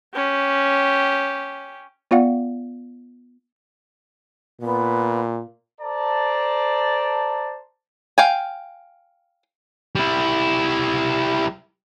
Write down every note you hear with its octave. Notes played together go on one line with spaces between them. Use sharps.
C#4 G4
B3 F4 D5 F5 F#5
A#2 B3
A4 C5 D5 A5 A#5
F5 G5 G#5
G3 E4